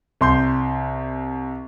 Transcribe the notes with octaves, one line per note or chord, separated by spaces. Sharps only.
C2 C6 G6